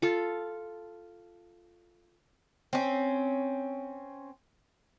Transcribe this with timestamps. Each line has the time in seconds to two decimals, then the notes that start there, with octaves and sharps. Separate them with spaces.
0.02 F4 A4
2.73 C4 C#4